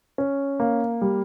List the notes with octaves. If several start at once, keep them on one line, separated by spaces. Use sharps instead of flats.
C#4
A#3
G3